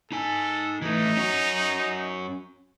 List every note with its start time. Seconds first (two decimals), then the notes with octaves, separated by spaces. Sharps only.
0.12 D#4 A4 G#5
0.82 E3 A3 D#4
1.17 C#4 F#4